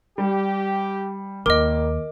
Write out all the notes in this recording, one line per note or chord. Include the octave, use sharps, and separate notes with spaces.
G3 G4
D#2 D#3 G3 A#3 A#4 D#5 D6